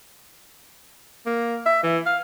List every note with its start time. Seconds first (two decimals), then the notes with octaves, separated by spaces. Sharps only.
1.26 A#3
1.65 E5
1.83 E3
2.06 F5